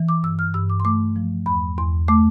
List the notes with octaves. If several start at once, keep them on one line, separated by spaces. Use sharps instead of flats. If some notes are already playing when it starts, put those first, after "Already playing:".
Already playing: E3
D6
G2 E6
F6
G2 E6
D6
C6
A3 D6
F3
E2 B5
E2 C6
A3 D6